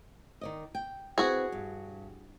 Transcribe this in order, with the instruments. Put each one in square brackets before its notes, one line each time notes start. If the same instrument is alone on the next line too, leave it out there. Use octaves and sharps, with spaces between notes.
[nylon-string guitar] D#3 D5 D#5
G5
[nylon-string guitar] C4 E4 B4 [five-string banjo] F#4 G#4
[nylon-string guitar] G2